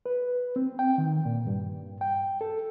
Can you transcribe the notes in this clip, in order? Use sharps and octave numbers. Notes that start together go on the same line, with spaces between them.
B4
C4
G5
D#3
A#2
G2
G5
A4